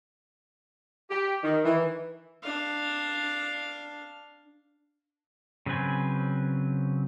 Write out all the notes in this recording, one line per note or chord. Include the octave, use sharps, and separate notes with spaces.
G4
D#3
E3
D4 F5
C#3 F#3 C4 B4 G#5